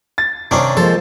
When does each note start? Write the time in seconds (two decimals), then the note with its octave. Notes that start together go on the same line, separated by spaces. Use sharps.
0.18 A6
0.51 C3 D#3 C#4 D4 C5
0.77 F3 G#3 A#3 F4 A4 C5